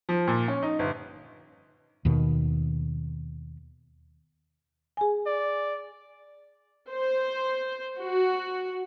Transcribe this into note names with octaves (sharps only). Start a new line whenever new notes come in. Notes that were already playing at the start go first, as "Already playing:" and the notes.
F3
A#2
C#4
D#4
G1
D#2 B2 D#3
G#4 G#5
D5
C5
F#4